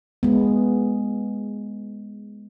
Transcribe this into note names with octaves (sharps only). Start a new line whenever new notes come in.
G#3 B3